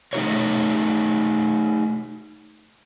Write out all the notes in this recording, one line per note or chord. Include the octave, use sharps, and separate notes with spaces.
A3 D#4 E4 F#4 A#4 C#5